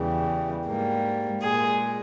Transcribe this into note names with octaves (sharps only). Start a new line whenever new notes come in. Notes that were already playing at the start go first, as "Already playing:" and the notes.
Already playing: E2 C#3 E3 G3
G#2 G3 A#3
A#2 G#3 G#4